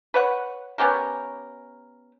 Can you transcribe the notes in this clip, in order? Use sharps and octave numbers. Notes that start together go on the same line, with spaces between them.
B4 C#5 F#5
B3 C#4 G4 A#4